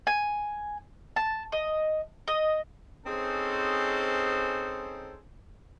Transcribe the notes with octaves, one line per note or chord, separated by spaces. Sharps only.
G#5
A5
D#5
D#5
C4 C#4 D#4 G#4 A4 C5